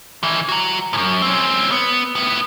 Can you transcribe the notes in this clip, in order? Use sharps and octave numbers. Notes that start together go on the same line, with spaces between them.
D#3 E3
F#4 A#5
F#2 A2
C4 C#4
B3
A2 B3